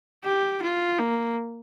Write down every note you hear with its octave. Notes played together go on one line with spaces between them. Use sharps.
G4
F4
A#3